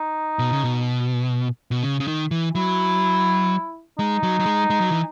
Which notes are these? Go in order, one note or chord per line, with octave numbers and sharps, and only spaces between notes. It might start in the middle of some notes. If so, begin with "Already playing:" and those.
Already playing: D#4
B2
C#3
B2
B2
C#3
C#3
D#3
E3
F#3 E4
G#3 D#4
F#3
F#3
G#3
G#3
F#3
E3